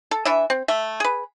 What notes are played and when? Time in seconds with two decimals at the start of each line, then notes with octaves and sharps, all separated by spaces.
0.11 A4
0.25 E3 D4 E4 E5
0.50 C4
0.68 A3 E5
1.00 G#4 B4